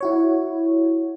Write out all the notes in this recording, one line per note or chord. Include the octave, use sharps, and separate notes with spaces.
E4 F#4 C#5